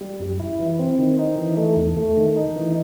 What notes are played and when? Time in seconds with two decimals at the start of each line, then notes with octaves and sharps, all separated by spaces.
0.01 G3
0.20 F#2
0.40 E4
0.59 E3
0.79 C4
0.99 D#3
1.19 D#4
1.38 E3
1.57 A3
1.77 E2
1.97 A3
2.17 D#3
2.36 D#4
2.56 E3